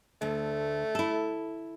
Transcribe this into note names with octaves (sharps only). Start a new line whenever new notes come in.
D2 A3
E4 A4